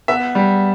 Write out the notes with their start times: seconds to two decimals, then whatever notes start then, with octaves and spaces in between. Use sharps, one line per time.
0.08 B3 E5
0.35 G3